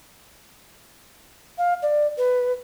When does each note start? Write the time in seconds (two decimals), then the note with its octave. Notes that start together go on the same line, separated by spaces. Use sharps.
1.58 F5
1.82 D5
2.18 B4